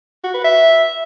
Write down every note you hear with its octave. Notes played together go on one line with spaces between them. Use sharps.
F#4
B4
E5